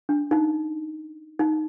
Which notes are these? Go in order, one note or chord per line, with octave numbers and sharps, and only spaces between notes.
D4
D#4
D#4